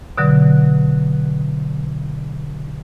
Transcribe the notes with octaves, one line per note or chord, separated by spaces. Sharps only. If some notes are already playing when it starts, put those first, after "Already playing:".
B2 D3 F#3